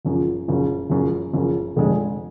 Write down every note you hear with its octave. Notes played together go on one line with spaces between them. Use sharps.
F#1 F#2 F3
F#1 F#2 F3
F#1 F#2 F3
F#1 F#2 F3
F1 F2 D3 G#3